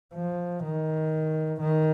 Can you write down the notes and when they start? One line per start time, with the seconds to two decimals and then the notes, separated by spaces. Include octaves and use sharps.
0.14 F3
0.64 D#3
1.60 D#3